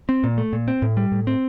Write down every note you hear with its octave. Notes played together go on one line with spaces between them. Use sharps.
C4
A#2
A3
A#2
C4
A2
G3
A2
C4